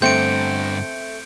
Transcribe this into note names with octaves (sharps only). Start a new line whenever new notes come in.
G2 D3 A3 C4 G6 C#7 D7